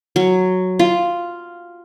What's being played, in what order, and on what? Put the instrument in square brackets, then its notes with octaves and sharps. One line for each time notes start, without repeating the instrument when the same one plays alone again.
[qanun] F#3
F4